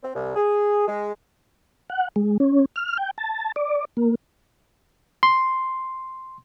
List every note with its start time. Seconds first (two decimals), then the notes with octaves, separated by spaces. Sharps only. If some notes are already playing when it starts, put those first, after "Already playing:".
0.03 C4
0.15 C2
0.36 G#4
0.87 G#3
1.90 F#5
2.16 G#3
2.40 C#4
2.76 F6
2.97 G5
3.18 A5
3.56 D5
3.97 A#3
5.23 C6